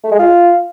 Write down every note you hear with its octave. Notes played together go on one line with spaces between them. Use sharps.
A3
G#3
F4